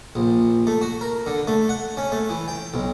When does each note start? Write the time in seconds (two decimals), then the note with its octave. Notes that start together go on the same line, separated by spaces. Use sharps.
0.15 A#1
0.67 A3
0.81 F#4
1.01 A#4
1.26 D3
1.47 A3
1.69 F#5
1.97 C#4
2.12 A3
2.29 E3
2.48 G5
2.74 B1